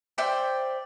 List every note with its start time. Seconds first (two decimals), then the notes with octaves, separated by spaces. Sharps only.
0.18 C5 D5 E5 G5